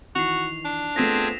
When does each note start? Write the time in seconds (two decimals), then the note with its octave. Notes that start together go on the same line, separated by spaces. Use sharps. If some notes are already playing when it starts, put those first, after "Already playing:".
0.15 D#3 E3 F#4 C7 F7
0.65 D4
0.96 A3 B3 C4 F4 G#4 A#6 B6 E7